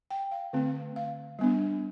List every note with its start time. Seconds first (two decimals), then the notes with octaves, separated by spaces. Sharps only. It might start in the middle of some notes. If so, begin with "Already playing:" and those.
0.11 G5
0.31 F5
0.53 D3 A3 C4
0.96 F5
1.39 G3 B3 D4